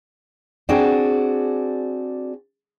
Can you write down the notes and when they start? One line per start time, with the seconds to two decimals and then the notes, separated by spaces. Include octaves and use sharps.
0.69 C4 D4 F#4 G#4 D5